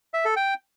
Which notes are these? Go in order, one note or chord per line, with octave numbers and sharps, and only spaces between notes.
E5
A4
G5